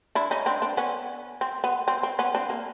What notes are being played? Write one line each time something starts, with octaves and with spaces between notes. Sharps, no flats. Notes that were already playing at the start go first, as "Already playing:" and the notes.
D4 E4
C#4 D#4
C4 D4
C4 D4
B3 C#4
C4
B3
C4
C4
B3 C#4
C4 D4
A#3